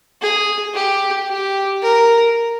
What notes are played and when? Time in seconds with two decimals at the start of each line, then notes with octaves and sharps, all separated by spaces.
0.21 G#4
0.75 G4
1.29 G4
1.82 A#4